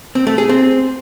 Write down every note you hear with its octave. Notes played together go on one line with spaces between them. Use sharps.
C4
A3
G#4
C4